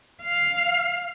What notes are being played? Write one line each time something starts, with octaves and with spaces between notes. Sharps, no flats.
F5